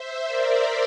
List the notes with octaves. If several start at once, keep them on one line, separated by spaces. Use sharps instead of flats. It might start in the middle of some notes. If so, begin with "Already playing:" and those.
Already playing: C5 E5
A#4 D5